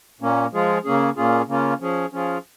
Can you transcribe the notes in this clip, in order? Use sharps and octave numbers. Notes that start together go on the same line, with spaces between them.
A#2 A#3 C#4
F3 G#3 F4 G#4
C#3 A#3 C#4 G#4
A#2 A#3 C#4 F4 G#4
C#3 A#3 C#4 F4
F3 C#4 G#4
F3 C#4 F4 G#4